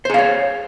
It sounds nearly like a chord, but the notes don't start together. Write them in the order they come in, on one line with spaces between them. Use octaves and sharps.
C5 G#4 F5 C#5